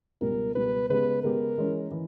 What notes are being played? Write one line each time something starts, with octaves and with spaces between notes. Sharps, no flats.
C#2 B2 G3 A#4
C#2 B2 G3 B4
C#3 G#3 B3 G4 B4
C#3 G#3 B3 G4 A#4
E3 G#3 C#4
E3